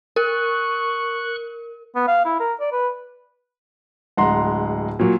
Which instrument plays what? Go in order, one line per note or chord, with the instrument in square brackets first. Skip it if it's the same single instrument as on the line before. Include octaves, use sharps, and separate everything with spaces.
[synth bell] A#4 [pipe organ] C#6 F#6
[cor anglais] B3
F5
E4
A#4
D5
B4
[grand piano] D1 G#3 F#5 A#5 C6
A#2 F#3